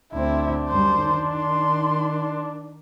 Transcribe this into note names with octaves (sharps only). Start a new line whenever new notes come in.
D2 C4 D4 E4
F#2 G3 C5
D#3
C6